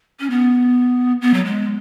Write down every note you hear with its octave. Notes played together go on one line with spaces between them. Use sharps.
C#4
B3
B3
F#3
G#3